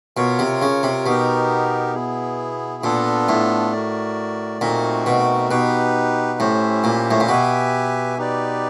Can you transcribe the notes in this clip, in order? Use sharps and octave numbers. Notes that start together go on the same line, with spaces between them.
B2 F4 A#4 C#5
C3
C#3
C3
B2 B3 D#4 G4 A#4
B3 E4 G#4
A#2 B3 D4 F4 A4
A2
F#4 A#4 D5
A#2 A3 C4 D#4 F#4 A#4
B2
B2 D#4 G4 B4
A2 C#4 E4 G4 C5 E5
A#2
A2
A#2
B2 G4 B4 E5 G#5
D#4 G4 B4 D5